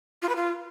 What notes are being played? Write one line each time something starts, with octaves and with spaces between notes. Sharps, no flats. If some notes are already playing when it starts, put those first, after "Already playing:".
F4
B4
F4